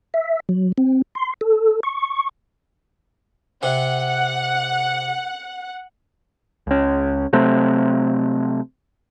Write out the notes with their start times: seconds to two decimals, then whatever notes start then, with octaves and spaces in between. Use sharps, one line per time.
0.14 E5
0.49 F#3
0.78 C4
1.15 C6
1.41 A4
1.83 C#6
3.63 C3 F#5
6.67 C#2 C#4
7.33 C3 F#3 A3 C4